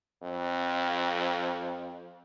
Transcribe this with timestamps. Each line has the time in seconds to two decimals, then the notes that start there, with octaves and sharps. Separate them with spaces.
0.22 F2